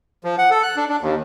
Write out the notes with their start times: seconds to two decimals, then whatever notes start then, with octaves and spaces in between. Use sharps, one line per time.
0.24 F3
0.38 F#5
0.51 A4
0.63 F#6
0.76 D4
0.89 D4
1.01 D#2